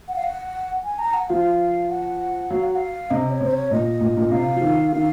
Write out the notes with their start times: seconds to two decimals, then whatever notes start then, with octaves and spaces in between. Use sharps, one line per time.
0.08 F#5
0.16 F5
0.23 F#5
0.84 G#5
0.99 A#5
1.14 F#5
1.29 F3 F5
1.89 F#5
2.50 F#3 F5
2.63 F#5
2.76 F5
3.10 C3 D#5
3.31 C#5
3.41 C3 C5
3.51 C#5
3.71 A#2 D#5
4.01 A#2
4.17 A#2
4.31 C3 F5
4.56 F3
4.61 D#3
4.92 D#3 F5